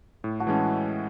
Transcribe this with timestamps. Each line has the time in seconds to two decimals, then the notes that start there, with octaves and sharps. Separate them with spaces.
0.24 A2
0.40 F#4 A4
0.47 E3 G#3 C#4